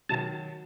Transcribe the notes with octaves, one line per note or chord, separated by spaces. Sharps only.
D#3 F#3 A5